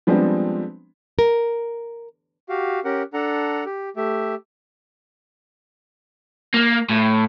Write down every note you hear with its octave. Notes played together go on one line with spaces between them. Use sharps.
F3 G3 G#3 B3 C4 D4
A#4
F#4 G4 F5
C#4 G4 A#4 F#5
D4 A4 F#5 A#5
G4
A3 G4 E5
A#3
A2